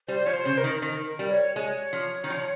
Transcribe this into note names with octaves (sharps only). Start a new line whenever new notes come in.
G3 C5
F3 C#5
C5
C#3
A#4
D#3
D#3 A#4
A#4
G3
C#5
G#3 C#5
F3
D#3
F3